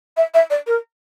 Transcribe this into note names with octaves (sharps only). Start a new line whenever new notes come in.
E5
E5
D5
A#4